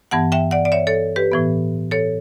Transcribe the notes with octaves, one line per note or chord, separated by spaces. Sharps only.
G2 E3 B3 F#5 A5
E5 G5
D5 F#5
D5
C#5 E5
A4 C#5
G4 B4
A2 E3 B3
A4 C#5